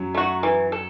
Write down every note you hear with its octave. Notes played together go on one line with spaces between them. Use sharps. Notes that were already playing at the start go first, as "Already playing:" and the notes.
Already playing: F#2 F#3
A3 F#4
E3
A4